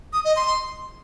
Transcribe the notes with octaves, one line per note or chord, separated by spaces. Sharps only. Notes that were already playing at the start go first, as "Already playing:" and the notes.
D#6
D#5
C6